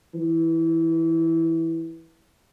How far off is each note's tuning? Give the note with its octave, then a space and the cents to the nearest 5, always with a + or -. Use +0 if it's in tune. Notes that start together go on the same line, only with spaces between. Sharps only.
E3 -10